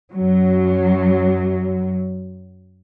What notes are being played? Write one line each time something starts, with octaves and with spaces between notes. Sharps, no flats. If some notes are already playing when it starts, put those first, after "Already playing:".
F#2 F#3